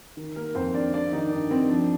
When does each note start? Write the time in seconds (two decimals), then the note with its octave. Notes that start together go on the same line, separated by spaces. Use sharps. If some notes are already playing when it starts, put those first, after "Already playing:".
0.17 D#3
0.36 A#3 A#4
0.55 F2 C4 C5
0.74 D4 D5
0.93 D3 D4 D5
1.12 D#3 D#4
1.31 G2 D4
1.51 C4
1.70 F3 D4